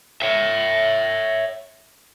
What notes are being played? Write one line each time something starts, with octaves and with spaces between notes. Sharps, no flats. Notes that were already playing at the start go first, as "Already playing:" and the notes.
C#5 E5